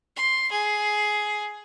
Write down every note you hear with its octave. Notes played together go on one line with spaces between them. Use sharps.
C6
G#4